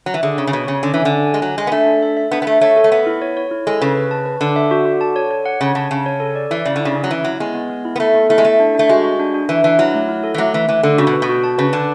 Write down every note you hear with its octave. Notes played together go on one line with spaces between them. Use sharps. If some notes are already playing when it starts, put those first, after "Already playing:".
F#3
E3
D3 G#4
C#3 C#5
C#3
B2 C#5
C#3 C#5
D3 C#4
E3 G#5
D3
G#5
G#5
G#3
F#3 D4
G#3 G#5
B3
A3 D4
D4
E5
E5
B3 D4
B3
A3 E5
A3 C#5
A4
A3
B3 E5
E4
C#5
C#5
E4
G#3 A4
C#3 B4
B4
A5
B4
D3 A5
E5
F#4
F#4
A5
C#5
C#5
F#5
C#3 C#5
C#3 A5
C#3 A5
C#5
A4
D5
E3 E4
C#3 D5
D3 E4
C#3
C#4
F#3
E3 E4
F#3 E4
G#3 B3
B3
B3
E4
B3
A3 A4
B3
A3 E4
G#3
A3 E4
D4
A3 D4
G#3 F#4
F#4
D4
D4
E3 B4
E3 D4
F#3 E4
A3
E4
A4
E3
F#3 A3
E3 A3
E3 A3
D3 A4
C#3 F#4
B2
B4
B2
F#4
A5
C#3 B4
D3 A5